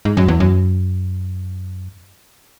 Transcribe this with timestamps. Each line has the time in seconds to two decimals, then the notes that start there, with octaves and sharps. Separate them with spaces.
0.05 G#2
0.17 F#2
0.28 E2
0.40 F#2